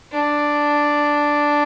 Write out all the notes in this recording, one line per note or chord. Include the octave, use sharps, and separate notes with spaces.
D4